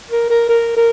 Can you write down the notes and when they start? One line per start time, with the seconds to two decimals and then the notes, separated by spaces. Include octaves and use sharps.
0.10 A#4
0.30 A#4
0.49 A#4
0.76 A#4